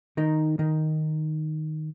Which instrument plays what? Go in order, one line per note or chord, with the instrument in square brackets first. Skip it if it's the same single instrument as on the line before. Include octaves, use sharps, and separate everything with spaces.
[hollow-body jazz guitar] D#3 D#4
D#3 D#4